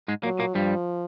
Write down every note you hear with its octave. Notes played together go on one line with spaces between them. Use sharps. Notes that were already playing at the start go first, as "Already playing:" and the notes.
G#2 G#3
A#2 F#3 A#3
A#2 A#3
G2 F3 G3